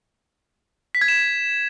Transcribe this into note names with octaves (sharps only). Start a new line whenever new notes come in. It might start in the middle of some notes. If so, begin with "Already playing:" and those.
B6
G#6
E7